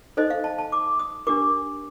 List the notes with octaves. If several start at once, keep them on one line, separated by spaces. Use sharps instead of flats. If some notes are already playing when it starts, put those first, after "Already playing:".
D#4 A4 C5 D#5
F5
A5
A5
D6
D#6
D4 G4 A#4 D6